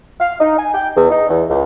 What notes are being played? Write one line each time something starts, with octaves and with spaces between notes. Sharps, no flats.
F5
D#4
G#5
G5
E2
D#4
E2
C#2